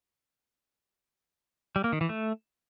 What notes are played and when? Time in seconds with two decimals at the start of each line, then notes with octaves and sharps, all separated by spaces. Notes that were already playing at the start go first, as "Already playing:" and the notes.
1.76 G3
1.84 A#3
1.93 D#3
2.01 E3
2.09 A3